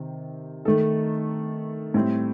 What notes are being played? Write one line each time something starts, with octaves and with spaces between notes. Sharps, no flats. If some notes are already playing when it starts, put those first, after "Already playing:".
Already playing: C3 D#3
D#3 A3 D#4 A4
A2 G3 C4